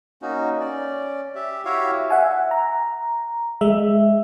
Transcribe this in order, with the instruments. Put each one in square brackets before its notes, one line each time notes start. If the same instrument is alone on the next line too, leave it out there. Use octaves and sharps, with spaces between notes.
[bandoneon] A#3 C#4 D#4 F#4
C#4 D5
G4 E5
E4 F#4 G4 C#5 E5 F5
[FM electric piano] E5 F#5 G#5
A#5
G#3 E5